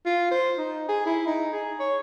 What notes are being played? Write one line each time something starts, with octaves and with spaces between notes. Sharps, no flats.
F4
C5
D#4
G#4
E4
D#4
G#4
C#5